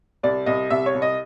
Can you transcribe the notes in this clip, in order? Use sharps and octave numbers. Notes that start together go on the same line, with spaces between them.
C2 D5
C2 D#5
C2 E5
C#5
C2
D#5